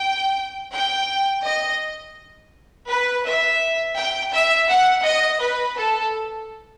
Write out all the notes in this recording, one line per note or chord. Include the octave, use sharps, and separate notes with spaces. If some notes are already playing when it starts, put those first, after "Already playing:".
Already playing: G5
G5
D#5
B4
E5
G5
E5
F#5
D#5
B4
A4